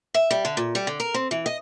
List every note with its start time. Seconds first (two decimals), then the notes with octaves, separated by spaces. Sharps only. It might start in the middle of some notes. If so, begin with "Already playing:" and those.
0.14 E5
0.31 G3
0.45 D3
0.57 A#2
0.75 G3
0.87 D3
1.00 A#4
1.14 C4
1.31 E3
1.46 D#5